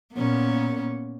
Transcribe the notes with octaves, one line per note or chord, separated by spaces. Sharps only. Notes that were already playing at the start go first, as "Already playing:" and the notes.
A#2 A#3 B3 C#4